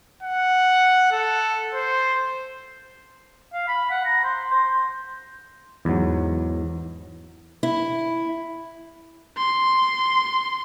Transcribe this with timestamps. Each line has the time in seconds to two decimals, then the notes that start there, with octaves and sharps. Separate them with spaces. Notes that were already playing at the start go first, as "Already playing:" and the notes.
0.23 F#5
1.12 A4
1.74 C5
3.53 F5
3.68 B5
3.91 F#5
4.05 A#5
4.24 C5
4.52 C5
5.85 E2 G#2 F#3
7.63 E4
9.38 C6